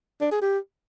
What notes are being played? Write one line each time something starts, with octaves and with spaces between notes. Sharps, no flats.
D4
G#4
G4